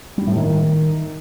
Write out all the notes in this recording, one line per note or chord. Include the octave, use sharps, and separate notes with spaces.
G3
A2
D#3